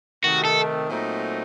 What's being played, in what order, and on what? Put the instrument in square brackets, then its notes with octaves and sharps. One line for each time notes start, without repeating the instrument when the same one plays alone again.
[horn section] C3 D#3 A3 [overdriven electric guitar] F#4
[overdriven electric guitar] A4
[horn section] A#2 F#3 A3 C4 D#4